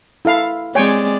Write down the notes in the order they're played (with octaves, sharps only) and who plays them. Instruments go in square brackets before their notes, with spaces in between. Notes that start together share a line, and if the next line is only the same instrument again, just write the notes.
[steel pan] E4 A4 F5
[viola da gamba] G#3 C4 D5 [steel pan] C#5 G5 G#5